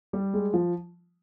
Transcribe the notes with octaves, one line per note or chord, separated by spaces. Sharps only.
G3
G#3
F3